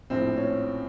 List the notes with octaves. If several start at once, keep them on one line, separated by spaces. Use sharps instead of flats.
A#1 A2 F3 C4
C#4